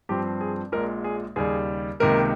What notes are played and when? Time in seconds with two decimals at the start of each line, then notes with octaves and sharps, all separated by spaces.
0.09 G2 F3 C4 G4
0.41 G#4
0.72 A#1 A#2 G#3 A#4
1.04 G#4
1.36 D#2 C#3 G3 G#4
2.00 C#2 C3 D#3 A#3 A#4